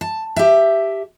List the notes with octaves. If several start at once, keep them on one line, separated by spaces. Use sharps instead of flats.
A5
G4 E5